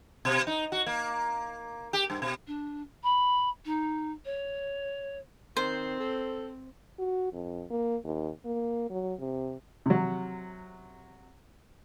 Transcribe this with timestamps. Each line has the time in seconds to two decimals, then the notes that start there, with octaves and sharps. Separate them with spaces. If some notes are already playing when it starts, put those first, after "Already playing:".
0.25 B2
0.47 D#4
0.72 F#4
0.86 A#3
1.93 G4
2.10 G2
2.22 B2
2.47 D4
3.03 B5
3.65 D#4
4.25 C#5
5.57 D#3 C4 C5
6.00 A4
6.99 F#4
7.33 F2
7.70 A#3
8.04 D#2
8.45 A#3
8.90 F#3
9.19 C3
9.86 C3 F#3